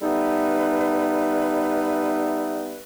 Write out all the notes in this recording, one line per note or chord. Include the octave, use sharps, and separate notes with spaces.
G3 A3 B3 D#4 A4 B4